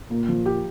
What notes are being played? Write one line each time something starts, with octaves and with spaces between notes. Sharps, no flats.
A#2 A#3
F3
G4